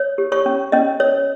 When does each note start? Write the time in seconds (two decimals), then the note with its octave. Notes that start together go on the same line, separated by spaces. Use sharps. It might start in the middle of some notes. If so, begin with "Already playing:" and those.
Already playing: C#5
0.18 G4
0.32 C#5 C#6
0.46 C#4
0.72 C#4 D#5
1.00 C#5